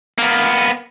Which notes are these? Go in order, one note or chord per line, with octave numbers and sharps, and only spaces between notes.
A#3 B3